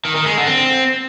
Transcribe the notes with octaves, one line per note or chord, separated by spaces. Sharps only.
D#3
D#3
G#3
D3
C4